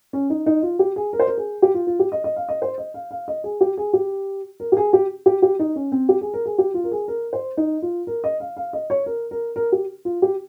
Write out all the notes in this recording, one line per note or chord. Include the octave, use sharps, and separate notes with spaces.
C#4
D#4
D#4
F4
G4
G#4
A#4
C5
A#4
G#4
G4
F4
F4
G4
D#5
D#5
F5
D#5
C5
D#5
F5
F5
D#5
G#4
G4
G#4
G4
A#4
G4
G#4
G4
G4
G4
D#4
C#4
C4
G4
G#4
A#4
G#4
G4
F4
A#4
G#4
A#4
C5
D#4
F4
A#4
D#5
F5
F5
D#5
C#5
A#4
A#4
A#4
G4
F4
G4